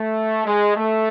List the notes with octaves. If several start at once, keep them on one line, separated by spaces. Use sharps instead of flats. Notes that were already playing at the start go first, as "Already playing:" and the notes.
Already playing: A3
G#3
A3